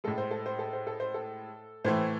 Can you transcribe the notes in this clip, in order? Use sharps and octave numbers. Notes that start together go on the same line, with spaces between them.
A2 G#3 A4
C5
A4
C5
A4
C5
A4
C5
A4
A2 E3 A3 C5